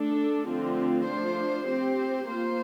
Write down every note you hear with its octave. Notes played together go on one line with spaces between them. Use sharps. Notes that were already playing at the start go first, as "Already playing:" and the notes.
Already playing: A3 D4 A4
D3 F3 A3 C4 F4
F3 A3 D4 F4 C5
C4 G4 C5
A#3 F4 C5